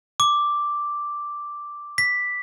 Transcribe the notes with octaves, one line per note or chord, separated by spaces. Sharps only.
D6
B6